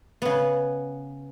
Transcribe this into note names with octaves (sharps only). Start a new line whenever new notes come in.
C#3 B3